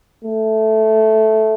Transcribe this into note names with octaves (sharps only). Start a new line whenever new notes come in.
A3